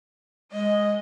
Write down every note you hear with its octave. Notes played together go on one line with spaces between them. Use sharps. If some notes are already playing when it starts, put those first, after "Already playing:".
G#3 D#5